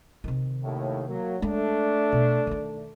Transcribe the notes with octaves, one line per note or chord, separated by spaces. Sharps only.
C3 D#3
D#2 A2
F#3 A#3
G#3 A3 D4
B2
D#3 D#4